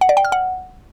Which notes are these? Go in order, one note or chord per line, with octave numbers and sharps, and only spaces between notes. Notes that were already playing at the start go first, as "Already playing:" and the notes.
F#5
D5
G5
F6
F#5